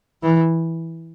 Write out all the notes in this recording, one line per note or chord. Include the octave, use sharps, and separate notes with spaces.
E3